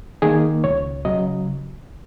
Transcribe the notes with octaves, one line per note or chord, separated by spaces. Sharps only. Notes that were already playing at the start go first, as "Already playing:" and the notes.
D#3 A#3 G#4
C#2 C#5
C#3 F#3 D#5